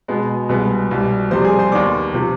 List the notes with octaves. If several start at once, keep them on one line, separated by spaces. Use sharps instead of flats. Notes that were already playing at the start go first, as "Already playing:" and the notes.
B2 G#3 B3
C2 B2 G#3 B3
C2 B2 G3
F2 C3 G3 C5 C6
G#4 G#5
C5 C6
D#2 D#3 B3 D5 D6
C3 F3